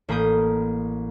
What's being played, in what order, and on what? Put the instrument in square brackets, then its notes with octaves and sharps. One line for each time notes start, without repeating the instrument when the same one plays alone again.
[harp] A1 A#3 B5 D#6 G6